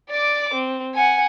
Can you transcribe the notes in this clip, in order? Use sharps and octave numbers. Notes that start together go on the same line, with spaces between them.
D5 D6
C4
F#5 G#5